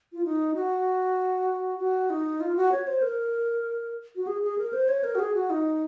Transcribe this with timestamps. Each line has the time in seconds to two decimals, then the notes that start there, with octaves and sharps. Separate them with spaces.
0.13 F4
0.25 D#4
0.55 F#4
1.79 F#4
2.10 D#4
2.40 F4
2.56 F#4
2.72 C#5
2.87 C5
3.02 A#4
4.16 F#4
4.27 G#4
4.42 G#4
4.58 A#4
4.73 C5
4.88 C#5
5.04 A#4
5.15 F#4
5.19 G#4
5.34 F#4
5.50 D#4